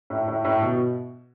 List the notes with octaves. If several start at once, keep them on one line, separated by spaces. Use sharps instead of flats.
A2
A2
A2
B2